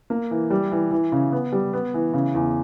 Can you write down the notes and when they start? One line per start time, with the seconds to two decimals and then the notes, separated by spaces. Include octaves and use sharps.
0.10 A#3
0.31 E3
0.50 G3
0.72 E3
0.91 E3
1.12 C#3
1.32 B3
1.52 G3
1.73 B3
1.94 E3
2.13 C#3
2.35 E2